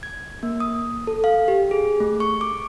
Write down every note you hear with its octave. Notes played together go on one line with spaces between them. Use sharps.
G#6
A#3
D#6
A4
F5
G4
G#4
A3
C#6
D6